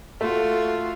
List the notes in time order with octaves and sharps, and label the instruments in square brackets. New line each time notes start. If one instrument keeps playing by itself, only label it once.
[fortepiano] A3 [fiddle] F4 F#4